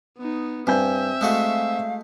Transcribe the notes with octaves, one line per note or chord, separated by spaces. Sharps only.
B3 D#4
G2 C4 E5 G#5 G6
G#3 A3 F#4 F5